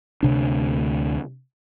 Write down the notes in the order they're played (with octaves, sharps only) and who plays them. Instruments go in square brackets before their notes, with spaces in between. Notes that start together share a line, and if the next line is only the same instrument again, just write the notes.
[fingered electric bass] D2 C3 D4